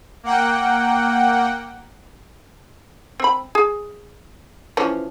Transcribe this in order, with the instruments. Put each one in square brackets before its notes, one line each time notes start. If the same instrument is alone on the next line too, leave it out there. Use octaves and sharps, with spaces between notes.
[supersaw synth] A#3 F#5 G5
[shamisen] C4 B5
G#4
E3 F3 C#4